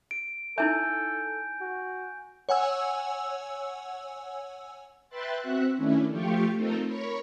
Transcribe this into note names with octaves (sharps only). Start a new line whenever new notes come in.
D7
D#4 E4 A4 E5 G#5 G6
F#4
C#5 F#5 G#5 E6
B4 E5 G5 C6 F#6 A6
C4 F#4 E5 F#5 F#6
D#3 A3 C#4 D4 E4
F3 A3 F4 G4 G5 C#6
A3 C4 D#4 F4 A4 A#4
A#4 C#5 B5 C#6